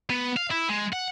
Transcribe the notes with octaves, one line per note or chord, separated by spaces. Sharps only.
B3
F5
E4
G#3
F#5